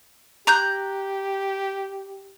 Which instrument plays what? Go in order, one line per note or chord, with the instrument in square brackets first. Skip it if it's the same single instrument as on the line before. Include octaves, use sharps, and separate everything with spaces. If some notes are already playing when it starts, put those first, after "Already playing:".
[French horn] G4 [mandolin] A#5 F#6 G6